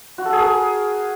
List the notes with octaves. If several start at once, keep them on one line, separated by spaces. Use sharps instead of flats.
F#4
A4
G#4
A#4